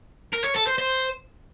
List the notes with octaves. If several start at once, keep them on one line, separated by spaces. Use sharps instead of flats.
A#4
C#5
A4
C5
C5